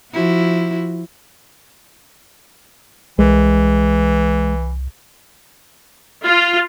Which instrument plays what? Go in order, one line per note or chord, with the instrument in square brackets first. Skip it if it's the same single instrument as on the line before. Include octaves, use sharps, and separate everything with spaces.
[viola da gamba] F3 E4 F#4
[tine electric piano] C2 [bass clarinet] E3 [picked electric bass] G#3
[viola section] F4